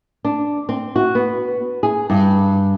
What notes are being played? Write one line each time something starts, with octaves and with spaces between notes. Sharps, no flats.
D4
C4
F#4
B3
G#4
G2